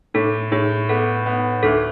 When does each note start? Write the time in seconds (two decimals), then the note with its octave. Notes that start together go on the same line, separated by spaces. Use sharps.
0.14 A2 A4
0.52 A2 G#4
0.89 B3 A4
1.26 B3
1.63 D2 A4